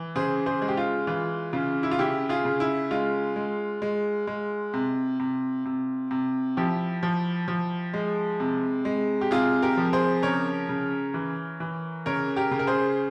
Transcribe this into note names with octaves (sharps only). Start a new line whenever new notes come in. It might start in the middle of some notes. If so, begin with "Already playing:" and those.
Already playing: E3
C#3 G#4 C5
G#4 C5
G#3 G#4
G4
F4
E3 F4
C#3 F4
E4
F4
C#3 E4 G4
F4 G#4
C#3
E4
G#3 F4
G#3
G#3
G#3
C3
C3
C3
C3
F3 E4 G4
F3
F3
G#3
C3
G#3
G4
C3 F4 G#4
G4 A#4
F3
G#4 C5
C#3 A#4 C#5
C#3
E3
E3
C#3 A#4 C#5
G4 A#4
C#3
A#4
G#4 C5